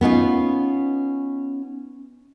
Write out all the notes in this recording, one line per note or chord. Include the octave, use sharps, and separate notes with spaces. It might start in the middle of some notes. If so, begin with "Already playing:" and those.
B3 C#4 D#4 F4